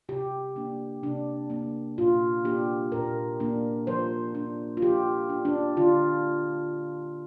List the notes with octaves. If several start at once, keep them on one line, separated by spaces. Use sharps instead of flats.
C3 G4
A#3 D4
C3 D4
A#3 D4
A#2 F4
A#3 D4 G4
A#2 A#4
A#3 D4
F3 C5
D4
F4
F3 G4
D4
D4
D3 F4